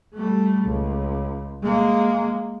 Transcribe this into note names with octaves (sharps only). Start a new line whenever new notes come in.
G3 A3
C#2
G#3 A#3